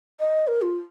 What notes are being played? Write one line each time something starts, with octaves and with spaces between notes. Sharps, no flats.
D#5
A#4
F4